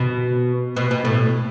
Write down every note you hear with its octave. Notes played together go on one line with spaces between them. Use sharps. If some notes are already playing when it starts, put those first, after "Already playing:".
Already playing: B2
B2
B2
A2